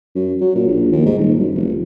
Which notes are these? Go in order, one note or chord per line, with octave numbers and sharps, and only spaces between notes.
F#2
F#3
A#2
A#1
D#2
G#2
D#1
F#2
F1